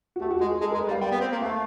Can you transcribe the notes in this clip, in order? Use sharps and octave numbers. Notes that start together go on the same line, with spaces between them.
F#4
A3 G4
F#4
G#3 G#4
G#4
G#3 A4
G#3 A#4
B4
G3
F5
G3 G5
B3
C4
A#3
A3 F5